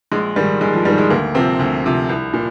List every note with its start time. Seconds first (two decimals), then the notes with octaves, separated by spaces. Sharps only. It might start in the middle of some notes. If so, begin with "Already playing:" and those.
0.12 A#1 G#3
0.36 G#2 D#3 G3
0.61 A#1 G#3
0.73 F3
0.85 G#2 D#3 G3
0.98 G#3
1.10 D2 A#3
1.34 C3 F3 C4
1.59 D2
1.84 C3 F3
2.09 C2
2.33 A#2